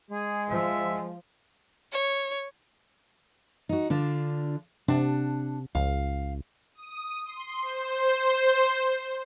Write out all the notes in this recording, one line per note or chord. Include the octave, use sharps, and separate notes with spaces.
G#3 G#4
F3 E5
C#5
D#4 F#4
D3 D4 F4
C3 D4 F#5 A5
C#2 F5
D#6
C6
C5